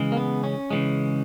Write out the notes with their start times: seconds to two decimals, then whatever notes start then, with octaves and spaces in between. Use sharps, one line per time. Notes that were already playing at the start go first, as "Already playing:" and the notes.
Already playing: C#3 E3 G#3
0.12 A#3
0.17 B3
0.43 C#4
0.71 C#3 E3 G#3